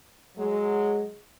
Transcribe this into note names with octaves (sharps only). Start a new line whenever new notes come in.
F#3 G#3